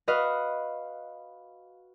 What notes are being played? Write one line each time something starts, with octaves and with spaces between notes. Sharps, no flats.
F#4 B4 D#5 F5